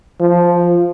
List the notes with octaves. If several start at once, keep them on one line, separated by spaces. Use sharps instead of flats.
F3